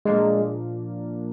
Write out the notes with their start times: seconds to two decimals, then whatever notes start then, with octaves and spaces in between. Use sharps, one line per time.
0.05 A#2 F3 G#3 A#3 D4